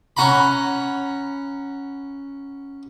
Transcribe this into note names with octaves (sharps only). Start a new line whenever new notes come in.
C#4 F#5 A#5 B5